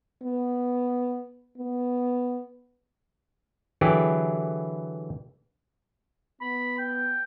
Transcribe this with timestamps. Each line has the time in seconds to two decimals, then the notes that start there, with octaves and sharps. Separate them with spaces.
0.23 B3
1.58 B3
3.81 D3 E3 F#3 E4 G4 G#4
6.41 B3 B5
6.78 G5